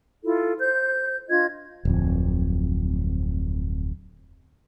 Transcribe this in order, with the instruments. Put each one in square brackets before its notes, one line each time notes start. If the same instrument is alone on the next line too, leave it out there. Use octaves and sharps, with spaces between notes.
[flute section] E4 F4 A4
C5 G6
D4 F4 D#5 G#6
[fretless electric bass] D1 F2